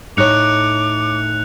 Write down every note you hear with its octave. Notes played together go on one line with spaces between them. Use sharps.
A2 D#4 C#5 D6 F#6 C#7 F7